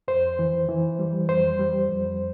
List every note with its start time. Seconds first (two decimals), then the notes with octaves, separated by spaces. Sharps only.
0.08 F2 C5
0.39 E3
0.69 E3
0.99 G3
1.29 F2 C5
1.59 G3
1.89 F2